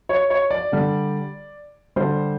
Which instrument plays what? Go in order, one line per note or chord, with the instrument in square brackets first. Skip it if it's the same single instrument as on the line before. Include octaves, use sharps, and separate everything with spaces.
[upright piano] C#5
C#5
D5
D3 G3
D3 G3 C5